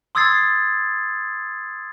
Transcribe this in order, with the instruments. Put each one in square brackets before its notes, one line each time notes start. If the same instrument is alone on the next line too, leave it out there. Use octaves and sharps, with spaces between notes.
[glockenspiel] C6 D#6 E6 G#6 A6 C7